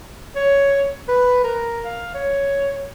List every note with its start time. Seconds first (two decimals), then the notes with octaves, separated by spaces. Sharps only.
0.35 C#5
1.08 B4
1.44 A#4
1.85 F5
2.14 C#5